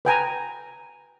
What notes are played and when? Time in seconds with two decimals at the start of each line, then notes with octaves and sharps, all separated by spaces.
0.05 B4 G5 G#5 A#5